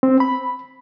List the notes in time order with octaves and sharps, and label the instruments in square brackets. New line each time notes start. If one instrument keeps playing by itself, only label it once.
[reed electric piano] C4
B5